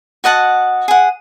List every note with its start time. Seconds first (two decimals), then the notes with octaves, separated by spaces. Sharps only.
0.24 F#4 D#5 F#5 A5
0.88 G#4 F#5